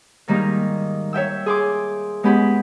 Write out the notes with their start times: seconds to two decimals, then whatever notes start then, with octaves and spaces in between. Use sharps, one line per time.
0.28 G#2 D#3 G3 A#3 D#4
1.13 C#5 E5 G5 E6
1.46 G#4 C6 D6
2.23 G#3 B3 C#4 G4 B5